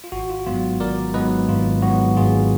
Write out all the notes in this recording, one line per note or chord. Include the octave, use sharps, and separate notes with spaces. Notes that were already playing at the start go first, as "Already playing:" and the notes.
F4
G#1 F#4
F4
G#2 F#3 B3 F4
G#1 A#4 D5
G#2 F#3 B3 B4 D#5
G#1 F4
G#2 F#3 B3 F#4
G#1 F4 G#4